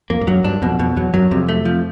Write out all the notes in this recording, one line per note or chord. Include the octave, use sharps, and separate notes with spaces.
F2 A#3
G2
F#2 F#3
G2 D4
F2 B2
F2 B2
E2 F#3
F#2 F#3
F2 C3
A3
F3